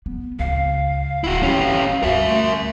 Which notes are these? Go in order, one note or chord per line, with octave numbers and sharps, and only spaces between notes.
B3
C#2 F5
D1 E4 F#4
G1 D#3 C#4 G4
D2 G2 F#4 A#4 E5
A3